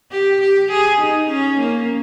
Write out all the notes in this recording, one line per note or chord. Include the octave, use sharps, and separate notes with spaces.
G4
G4
G#4
D#4
C#4
A#3